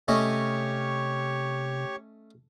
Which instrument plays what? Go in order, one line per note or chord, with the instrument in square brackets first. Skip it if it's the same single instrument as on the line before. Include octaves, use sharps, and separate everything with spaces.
[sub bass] C3 [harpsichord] A3 C#4 D#5 [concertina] G4 C#5 C#6